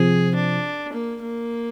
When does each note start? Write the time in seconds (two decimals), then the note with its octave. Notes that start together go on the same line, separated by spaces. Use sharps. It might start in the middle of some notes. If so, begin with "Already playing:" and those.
Already playing: C3 F3 C4 G#4
0.35 D4
0.93 A#3
1.21 A#3